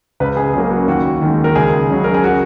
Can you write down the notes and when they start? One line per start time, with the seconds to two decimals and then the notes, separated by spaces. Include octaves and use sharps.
0.20 C#2 B4
0.37 G#4
0.53 C#3 F#3 A#3 G#4
0.70 F#4
0.88 D#2 F#4
1.22 D#3 G#3
1.44 A#4
1.55 C#2 G#4
1.90 C#3 F#3
2.04 A#4
2.14 G#4
2.24 F#4